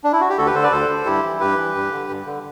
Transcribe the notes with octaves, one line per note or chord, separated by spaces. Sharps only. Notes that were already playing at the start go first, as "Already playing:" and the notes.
D4
E4
F#4
G4
D2 F#4 A4
G4 B4
D3 A4 C5
B4 D5
D2 A4 C5
D3
G2 E4 G4
E3
G2 G4 B4
E3
G2
D3
G2
D3